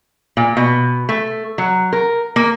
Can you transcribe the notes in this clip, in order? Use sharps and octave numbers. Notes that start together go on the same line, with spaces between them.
A#2
B2
A3
F#3
A#4
A#3